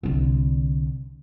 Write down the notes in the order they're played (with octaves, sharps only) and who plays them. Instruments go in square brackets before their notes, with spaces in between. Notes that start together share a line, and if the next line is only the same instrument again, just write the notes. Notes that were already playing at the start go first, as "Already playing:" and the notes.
[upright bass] C2 D3